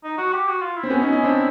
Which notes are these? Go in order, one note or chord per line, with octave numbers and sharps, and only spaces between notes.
D#4
F#4
G4
F#4
F4
E4
C4
B3 C#4
C#4 D#4
C#4 D#4
C4 D4